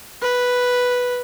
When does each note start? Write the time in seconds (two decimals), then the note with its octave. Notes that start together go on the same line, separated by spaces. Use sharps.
0.22 B4